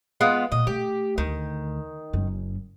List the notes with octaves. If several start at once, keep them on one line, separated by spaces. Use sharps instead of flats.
G#3 B3 F4
A#2 D#5
A3 G4
D2 D#3
F#1 F#2